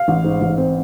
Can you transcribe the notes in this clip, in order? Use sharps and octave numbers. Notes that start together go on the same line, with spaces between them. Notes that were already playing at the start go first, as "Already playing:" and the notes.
Already playing: F5
A1
G#2
A1
C4